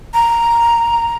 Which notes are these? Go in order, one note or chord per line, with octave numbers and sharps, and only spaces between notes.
A#5